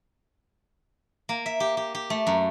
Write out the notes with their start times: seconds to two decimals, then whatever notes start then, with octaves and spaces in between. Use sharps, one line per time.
1.29 A#3
1.46 E5
1.60 G4
1.77 G4
1.95 G4
2.10 A3
2.27 F#2